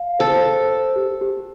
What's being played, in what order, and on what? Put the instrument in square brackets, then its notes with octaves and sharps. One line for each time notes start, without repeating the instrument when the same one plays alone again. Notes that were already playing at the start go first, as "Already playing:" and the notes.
Already playing: [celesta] F5
[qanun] A4 [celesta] C5
[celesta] C5
C5
G4
G4